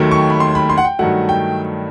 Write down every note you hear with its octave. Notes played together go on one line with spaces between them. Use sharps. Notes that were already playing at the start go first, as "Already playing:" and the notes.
Already playing: D#2 D#3 F#3 A3
C#6
B5
C6
B5
C6
F#5
G5
G2 D#3 F#3 A3 F#5
G5